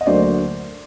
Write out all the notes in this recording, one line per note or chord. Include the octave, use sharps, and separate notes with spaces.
D#5
D2 D3 F#3 A#3 C5 D5